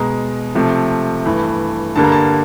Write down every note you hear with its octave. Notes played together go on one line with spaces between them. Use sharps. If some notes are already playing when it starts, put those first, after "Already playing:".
Already playing: B2 G#3 A#5
C3 F3 A3
G2 E3 A3
G2 D3 G3 A#3 A5
A#5
A5